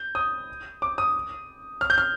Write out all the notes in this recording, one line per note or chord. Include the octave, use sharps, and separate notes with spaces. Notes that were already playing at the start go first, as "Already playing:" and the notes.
Already playing: G6
D#6
D6
D#6
F6
G6
F6